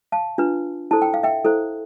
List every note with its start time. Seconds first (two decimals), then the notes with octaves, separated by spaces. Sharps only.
0.12 F5 A5
0.38 D4 F4 B4
0.91 E4 A4 C5 A5
1.02 G5
1.14 F5
1.23 E5 G5
1.45 E4 A4 C5